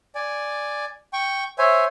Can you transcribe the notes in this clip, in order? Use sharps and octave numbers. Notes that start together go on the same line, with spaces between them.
D5 G#5
G5 C#6
C5 C#5 E5 G#5